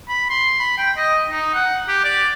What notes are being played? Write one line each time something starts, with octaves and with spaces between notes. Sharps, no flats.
B5
C6
B5
G5
D#5
D#4
F#5
G4
D5